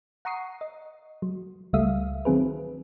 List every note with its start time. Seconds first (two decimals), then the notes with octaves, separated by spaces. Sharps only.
0.25 F#5 A#5 C#6 D#6 C7
0.61 D#5
1.22 F#3
1.73 C#2 G3 A3 E5 F5 D#6
2.25 D#3 F#3 C4 G#4 B4